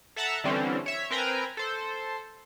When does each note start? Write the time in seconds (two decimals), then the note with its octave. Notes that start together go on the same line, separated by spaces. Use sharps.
0.16 A4 E5 F#5 A5 A#5
0.44 D3 E3 G3 C4 C#4
0.86 C#5 E5
1.11 C4 A#4 B4 G5 G#5 A#5
1.57 A4 C5